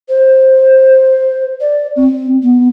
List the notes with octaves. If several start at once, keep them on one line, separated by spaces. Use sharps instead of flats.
C5
D5
C4
B3